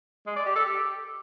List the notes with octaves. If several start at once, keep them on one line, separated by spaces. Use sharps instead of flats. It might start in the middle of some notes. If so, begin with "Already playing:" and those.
G#3
D5
G4
A4
G4